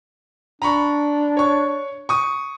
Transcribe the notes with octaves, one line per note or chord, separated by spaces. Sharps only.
D4 A#5 B5 C#6
C#5 C#6
C#6 D#6